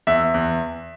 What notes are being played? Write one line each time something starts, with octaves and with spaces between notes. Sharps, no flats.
E2 E5
E2